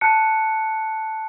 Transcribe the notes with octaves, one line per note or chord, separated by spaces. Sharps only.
A5 F#6 C#7